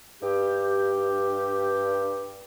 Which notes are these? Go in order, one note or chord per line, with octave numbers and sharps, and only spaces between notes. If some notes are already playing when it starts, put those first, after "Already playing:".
G2 G4